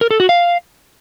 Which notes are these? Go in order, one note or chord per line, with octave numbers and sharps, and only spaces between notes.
A#4
A4
F#4
F5